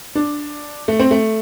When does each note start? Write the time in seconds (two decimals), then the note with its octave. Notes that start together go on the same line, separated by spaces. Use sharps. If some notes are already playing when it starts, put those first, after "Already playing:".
0.15 D4
0.88 A3
0.99 C4
1.11 A3